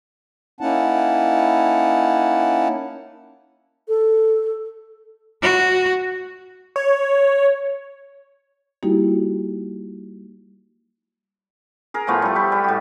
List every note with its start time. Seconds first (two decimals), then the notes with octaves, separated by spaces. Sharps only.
0.61 A#3 C#4 D#4 E4 F#5 A5
3.88 A4
5.42 F#4
6.76 C#5
8.83 G3 A#3 D#4 E4 F#4 G4
11.94 G#4 A#4
12.07 A2 F3 A3 B3
12.22 G3 A4
12.35 G4 B4
12.52 G3
12.64 A2 F#4